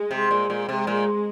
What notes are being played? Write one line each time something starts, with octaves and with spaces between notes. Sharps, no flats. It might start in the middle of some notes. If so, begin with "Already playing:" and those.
Already playing: G#3
C3
A#2
A#2
C3 G#3
A#2